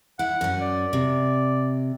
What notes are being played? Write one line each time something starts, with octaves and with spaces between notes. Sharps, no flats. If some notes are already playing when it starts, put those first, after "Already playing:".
E4 F#5
F#2 C#4
D5
C3